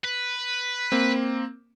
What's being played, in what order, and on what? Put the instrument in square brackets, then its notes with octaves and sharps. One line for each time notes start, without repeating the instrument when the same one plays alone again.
[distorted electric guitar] B4
[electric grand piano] A#3 C4